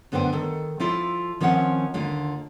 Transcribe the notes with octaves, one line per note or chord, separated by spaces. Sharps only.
F#2 D3 B3 D4 C5 G5
D#3 A4
F3 E4 F4 A4
D#3 F3 C4 C#4 F5 F#5
D#2 D3 F4